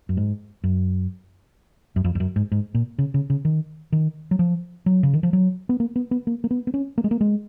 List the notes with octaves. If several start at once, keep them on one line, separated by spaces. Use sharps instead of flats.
F#2
G#2
F#2
F#2
F2
F2
F#2
G#2
G#2
A#2
C#3
C#3
C#3
D#3
D#3
F#3
F3
F#3
C#3
D#3
F3
F#3
B3
A#3
B3
B3
A#3
A#3
B3
B3
C#4
A#3
G#3
A#3
G#3